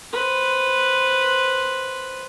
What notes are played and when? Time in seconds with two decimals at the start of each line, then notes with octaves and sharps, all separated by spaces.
0.13 B4 C5